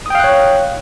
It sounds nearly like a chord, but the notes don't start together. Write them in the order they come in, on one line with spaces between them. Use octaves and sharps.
D#6 G5 F5 F#6 C#5